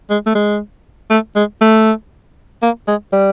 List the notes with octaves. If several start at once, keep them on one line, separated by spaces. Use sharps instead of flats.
G#3
A3
G#3
A3
G#3
A3
A#3
G#3
G3